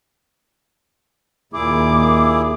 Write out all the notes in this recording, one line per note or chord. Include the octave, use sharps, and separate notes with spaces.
D#2 A#2 E4 G#4 D6